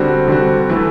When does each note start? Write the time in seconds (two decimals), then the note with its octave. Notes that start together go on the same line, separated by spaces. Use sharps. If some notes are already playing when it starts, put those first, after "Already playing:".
Already playing: D3 G3 C4 F#4
0.28 D3 G3 C4 F#4
0.69 E3 A3 E4